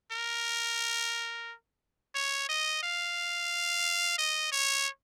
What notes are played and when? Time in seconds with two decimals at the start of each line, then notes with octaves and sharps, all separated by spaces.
0.12 A#4
2.15 C#5
2.49 D#5
2.83 F5
4.18 D#5
4.52 C#5